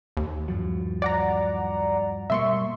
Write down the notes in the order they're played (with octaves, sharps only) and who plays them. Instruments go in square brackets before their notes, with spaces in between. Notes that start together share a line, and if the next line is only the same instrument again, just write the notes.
[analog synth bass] D#2
[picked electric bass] G2 F3 F#3
[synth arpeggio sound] D5 F#5 A#5
[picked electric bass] B2 G3 A#3 [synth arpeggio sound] E5 C6 C#6